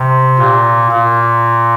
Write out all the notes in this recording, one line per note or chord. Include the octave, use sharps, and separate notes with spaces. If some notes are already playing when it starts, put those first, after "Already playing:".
Already playing: C3
A#2
A#2